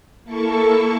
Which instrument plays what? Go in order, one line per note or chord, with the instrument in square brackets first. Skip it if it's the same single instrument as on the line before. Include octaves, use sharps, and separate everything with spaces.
[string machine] A#3 E4 A4 A5 C#6